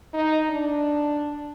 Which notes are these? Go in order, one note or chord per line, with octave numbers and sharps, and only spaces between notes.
D#4
D4